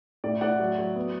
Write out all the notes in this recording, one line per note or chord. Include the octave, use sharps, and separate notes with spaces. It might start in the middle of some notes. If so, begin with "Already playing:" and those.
A2 D5
A2 D5 F#5
F#3
F#3
B3